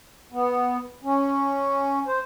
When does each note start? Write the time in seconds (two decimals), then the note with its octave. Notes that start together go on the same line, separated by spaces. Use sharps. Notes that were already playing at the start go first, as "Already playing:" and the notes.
0.32 B3
1.04 C#4
2.07 C5